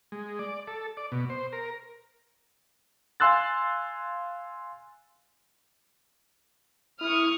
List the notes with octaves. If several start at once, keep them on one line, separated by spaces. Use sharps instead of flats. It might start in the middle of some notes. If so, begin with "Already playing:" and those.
G#3
D5
A4
D5
B2
C5
A#4
F5 G#5 C6 E6 F#6 A6
E4 C#6 D#6 F6